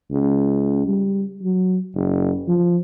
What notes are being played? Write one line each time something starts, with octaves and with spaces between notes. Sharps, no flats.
C#2
G3
F#3
F#1
F3